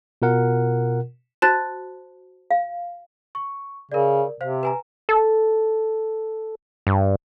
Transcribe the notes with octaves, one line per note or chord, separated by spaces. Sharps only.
B2 F4 A#4 F#5
F#4 C5 A5 F#6 A6
F5
C#6
C#3 A#4 D5
C3 C5 F5
B4 G#5 A#5
A4
G2